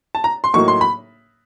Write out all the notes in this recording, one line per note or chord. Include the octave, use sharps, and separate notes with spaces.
A5
A#5
C6
A2 F#3 A#3 D#4 C#6
C6
B5